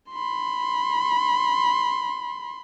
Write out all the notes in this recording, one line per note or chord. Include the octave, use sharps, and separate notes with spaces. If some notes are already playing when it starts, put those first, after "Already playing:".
B5 C6